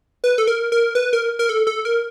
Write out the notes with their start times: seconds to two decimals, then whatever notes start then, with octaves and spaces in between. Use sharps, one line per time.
0.24 B4
0.38 A4
0.48 A#4
0.72 A#4
0.95 B4
1.13 A#4
1.39 A#4
1.49 A4
1.67 A4
1.85 A#4